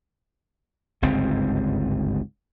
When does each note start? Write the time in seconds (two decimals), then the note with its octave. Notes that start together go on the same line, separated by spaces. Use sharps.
1.02 G1 C#2 G#2 C4